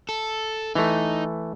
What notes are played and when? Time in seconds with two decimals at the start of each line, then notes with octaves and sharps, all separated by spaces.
0.09 A4
0.75 E3 A3 D#4